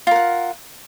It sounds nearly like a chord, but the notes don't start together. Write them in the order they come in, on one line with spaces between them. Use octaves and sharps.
F4 A#4 F#5